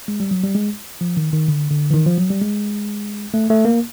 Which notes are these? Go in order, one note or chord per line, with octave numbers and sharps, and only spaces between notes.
G#3
G3
F#3
G3
G#3
F3
D#3
D#3
D3
D3
E3
D#3
F3
F#3
G3
G#3
A3
A3
A#3